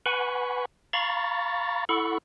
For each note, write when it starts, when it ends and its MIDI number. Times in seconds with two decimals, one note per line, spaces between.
0.06 0.65 71
0.06 0.65 78
0.06 0.65 80
0.06 0.65 83
0.06 0.65 85
0.93 1.85 77
0.93 1.85 82
0.93 1.85 83
0.93 1.85 85
0.93 1.85 93
1.89 2.18 64
1.89 2.18 69
1.89 2.18 78
1.89 2.18 83
1.89 2.18 85